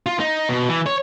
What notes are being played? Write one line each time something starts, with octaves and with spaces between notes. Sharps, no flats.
F4
D#4
B2
E3
C#5